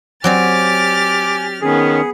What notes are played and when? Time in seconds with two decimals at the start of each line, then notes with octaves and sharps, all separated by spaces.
0.24 F#3 C4 G4 D5 G#5 D6 F6 A6
1.62 D#3 B3 C#4 G#4